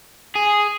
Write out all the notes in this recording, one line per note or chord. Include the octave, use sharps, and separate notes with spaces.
G#4